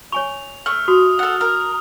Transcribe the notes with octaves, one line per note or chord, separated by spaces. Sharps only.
C#5 G#5 C#6 F7
A3 F6
F#4 D#6
A4 F#5
A#4